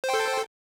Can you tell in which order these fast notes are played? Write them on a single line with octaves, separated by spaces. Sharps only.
C5 G5 A4